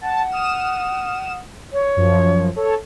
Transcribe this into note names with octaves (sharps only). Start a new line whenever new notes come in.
F#5 A5
D#6 F6 E7
C#5
F#2 F3
A4 C#5